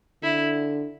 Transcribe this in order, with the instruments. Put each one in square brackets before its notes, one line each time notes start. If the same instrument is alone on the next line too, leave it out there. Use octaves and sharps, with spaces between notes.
[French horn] D3 [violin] E4